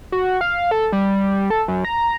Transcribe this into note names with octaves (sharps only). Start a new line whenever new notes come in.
F#4
F5
A4
G3
A4
F#2
A#5